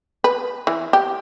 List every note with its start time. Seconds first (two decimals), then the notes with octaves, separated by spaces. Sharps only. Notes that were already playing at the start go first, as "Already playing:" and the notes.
0.24 B4
0.67 E3
0.93 G4